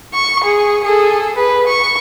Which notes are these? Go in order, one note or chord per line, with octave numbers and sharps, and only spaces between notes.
C#6
G#4
G#4 A4
B4
C#6